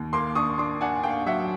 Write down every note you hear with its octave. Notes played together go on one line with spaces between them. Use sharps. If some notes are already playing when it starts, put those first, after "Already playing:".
Already playing: D#2
A#3 C6 D6
D4 C#6 D#6
D4 C6 D6
D4 F#5 G#5
A#3 F5 G5
F#3 E5 F#5